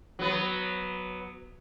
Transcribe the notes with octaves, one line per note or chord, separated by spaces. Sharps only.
F#3 B3